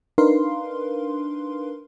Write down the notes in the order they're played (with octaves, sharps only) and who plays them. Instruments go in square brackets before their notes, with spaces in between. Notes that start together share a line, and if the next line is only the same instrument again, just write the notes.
[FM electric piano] D4 D#4 A#4 B4 F5 C6